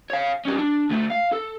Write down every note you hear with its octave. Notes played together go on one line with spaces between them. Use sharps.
C#5 F5
G3 C#4
D4
D2 A3
F5
A4